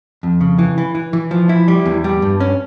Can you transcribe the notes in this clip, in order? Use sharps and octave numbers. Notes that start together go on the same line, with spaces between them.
F2
C#3
E3
E3
E3
E3
F3
E4
G3
E2
G3
G2
C#4